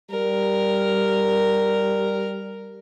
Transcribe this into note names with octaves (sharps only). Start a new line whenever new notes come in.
G3 A#4